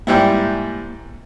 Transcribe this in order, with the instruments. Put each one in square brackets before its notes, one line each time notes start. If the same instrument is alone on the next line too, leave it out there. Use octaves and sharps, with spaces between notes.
[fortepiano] G#2 G3 E4 [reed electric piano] A#3